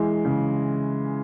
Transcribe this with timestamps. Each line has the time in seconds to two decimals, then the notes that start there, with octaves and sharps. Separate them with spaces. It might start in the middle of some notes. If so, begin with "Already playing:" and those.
Already playing: E3 G#3
0.25 C#3